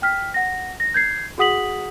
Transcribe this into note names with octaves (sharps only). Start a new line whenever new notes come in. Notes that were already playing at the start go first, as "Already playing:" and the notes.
G5 F6 B6
F#5 A#6
A#6
G6 G#6 C7
F#4 G#4 F#5 D#6 B6 F#7